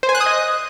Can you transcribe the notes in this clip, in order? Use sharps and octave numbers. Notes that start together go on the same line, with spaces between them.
C5
G#5
F#6
D#6
D#5